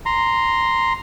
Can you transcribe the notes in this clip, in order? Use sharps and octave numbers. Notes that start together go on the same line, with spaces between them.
A#5 C6